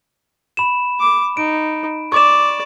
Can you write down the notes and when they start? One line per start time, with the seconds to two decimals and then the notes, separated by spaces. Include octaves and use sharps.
0.57 B5 E7
1.00 D6
1.37 D#4 D7
2.12 D5 C#6 D6 E7